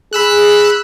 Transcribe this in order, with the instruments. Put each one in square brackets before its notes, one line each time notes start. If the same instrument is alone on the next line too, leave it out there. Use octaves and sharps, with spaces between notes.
[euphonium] G#4 [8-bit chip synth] B5 E6 F#6